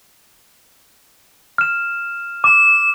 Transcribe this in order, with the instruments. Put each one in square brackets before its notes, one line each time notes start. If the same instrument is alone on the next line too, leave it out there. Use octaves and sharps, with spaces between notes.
[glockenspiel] F6 E7
[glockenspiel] D6 [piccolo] E7